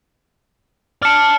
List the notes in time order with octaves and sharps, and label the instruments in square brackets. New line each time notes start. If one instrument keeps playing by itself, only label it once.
[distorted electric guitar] D5 A5 [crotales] F6 C#7